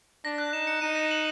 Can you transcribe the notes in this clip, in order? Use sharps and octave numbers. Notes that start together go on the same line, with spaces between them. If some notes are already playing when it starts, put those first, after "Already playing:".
D4 A#6
F#6
D#4 E7
C#7
D#4 D#7
A#6
F#7